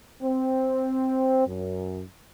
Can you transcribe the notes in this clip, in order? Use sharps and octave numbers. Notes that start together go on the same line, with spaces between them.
C4
F#2